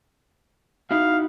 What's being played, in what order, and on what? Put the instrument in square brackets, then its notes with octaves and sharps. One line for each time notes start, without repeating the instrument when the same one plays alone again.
[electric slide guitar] D#4 E4 F#4 [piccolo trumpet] F5